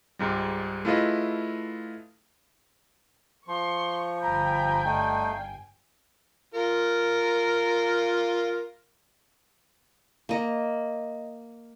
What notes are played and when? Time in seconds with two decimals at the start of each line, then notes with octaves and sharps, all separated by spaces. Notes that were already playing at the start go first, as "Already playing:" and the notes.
0.19 C#2 G#2 G3
0.85 A3 E4 F4 G#4 B4 D#5
3.48 F3 C6 C#6
4.20 G1 G5 G#5 A#5 B5 E6 G6
4.85 A3 D#4 D5 F5
6.54 F4 A#4
10.29 A#3 D#5